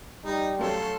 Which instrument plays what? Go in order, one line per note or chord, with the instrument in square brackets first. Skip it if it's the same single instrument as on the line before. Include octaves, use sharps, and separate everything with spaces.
[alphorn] G3 [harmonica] D#4
[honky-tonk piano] F#2 A3 C#5 [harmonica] A4 F5 C6